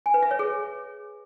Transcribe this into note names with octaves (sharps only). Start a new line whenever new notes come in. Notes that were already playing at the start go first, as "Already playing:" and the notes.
G#5
B4
E5
C#5
G#4